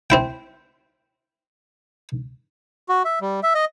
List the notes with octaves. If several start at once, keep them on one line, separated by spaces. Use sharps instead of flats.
C4 E4 G5
F#4
E5
G3
E5
D#5